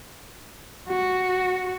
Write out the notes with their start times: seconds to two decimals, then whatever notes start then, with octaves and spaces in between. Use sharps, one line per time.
0.89 F#4